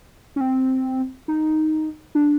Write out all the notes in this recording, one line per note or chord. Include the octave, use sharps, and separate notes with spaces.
C#4
C4
D#4
D4